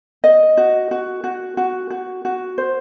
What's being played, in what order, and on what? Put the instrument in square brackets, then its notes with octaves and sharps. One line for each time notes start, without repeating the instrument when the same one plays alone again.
[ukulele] D#5
F#4
F#4
F#4
F#4
F#4
F#4
C5